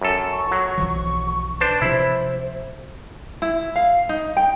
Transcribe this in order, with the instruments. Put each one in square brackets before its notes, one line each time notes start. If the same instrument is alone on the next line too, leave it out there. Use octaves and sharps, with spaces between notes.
[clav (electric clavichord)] F#2 A4
[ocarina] C#6
[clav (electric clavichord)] F#3
[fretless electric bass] B1 E3 F3
[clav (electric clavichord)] D4 C5 A5 [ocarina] B4
[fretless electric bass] C3 F3 [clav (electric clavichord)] E4 [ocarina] C5
[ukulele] E4
F5
D#4
G5